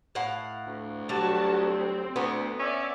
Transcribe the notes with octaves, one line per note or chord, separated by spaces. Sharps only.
A2 F5 F#5
D2
F#3 G3 F#4 A5
C4
D2 B3
C#4 D5 E5